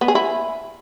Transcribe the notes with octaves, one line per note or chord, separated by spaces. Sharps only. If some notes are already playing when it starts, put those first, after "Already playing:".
B3
G#4
E4